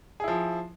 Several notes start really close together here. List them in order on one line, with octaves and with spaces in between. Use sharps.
G#4 E4 F3